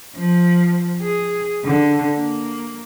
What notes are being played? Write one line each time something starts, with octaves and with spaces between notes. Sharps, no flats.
F3
G#4
D3
A#3